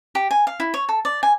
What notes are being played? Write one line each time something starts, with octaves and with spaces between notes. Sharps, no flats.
G4
G#5
F5
E4
C#5
A4
D5
G#5